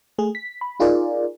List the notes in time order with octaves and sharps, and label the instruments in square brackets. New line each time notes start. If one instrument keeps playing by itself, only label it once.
[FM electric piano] A3 G#4
B6
B5
D#4 F4 G#4 A#4 D5